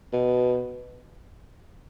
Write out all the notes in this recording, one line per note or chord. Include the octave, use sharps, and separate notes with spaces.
B2